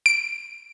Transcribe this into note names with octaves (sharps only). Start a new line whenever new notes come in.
D7